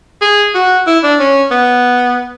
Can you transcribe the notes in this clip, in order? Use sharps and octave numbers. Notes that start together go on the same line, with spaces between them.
G#4
F#4
E4
D4
C#4
B3